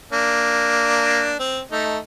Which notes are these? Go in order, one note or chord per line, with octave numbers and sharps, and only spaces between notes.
A#3 D4
C4
A3 D#4